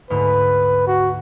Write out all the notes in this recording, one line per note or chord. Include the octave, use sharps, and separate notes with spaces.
D2 G#2 B4 F6
F#4